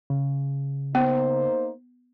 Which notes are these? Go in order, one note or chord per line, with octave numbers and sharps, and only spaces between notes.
C#3
A#3 B3 D#4 C5